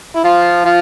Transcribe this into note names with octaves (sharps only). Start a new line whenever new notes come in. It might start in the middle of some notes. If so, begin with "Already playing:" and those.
E4
F3 F4
F3 F4